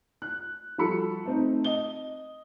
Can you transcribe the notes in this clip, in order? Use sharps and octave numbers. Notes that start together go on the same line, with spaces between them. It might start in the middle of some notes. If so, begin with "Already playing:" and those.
F#6
F3 G3 F#4 A4 B5 C#7
A3 C4 D#4
D#5 G7